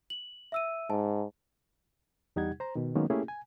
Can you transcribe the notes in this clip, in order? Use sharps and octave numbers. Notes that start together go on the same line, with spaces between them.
F#7
E5 E6 D#7
G#2 A5
E2 G3 D#4 G4 F#5 G#6
C5 A#5
B2 D#3
D#3 F#3 G#3 A#3 B3 C#4
A3 A#3 C#4 E4 G4 G#4
G#5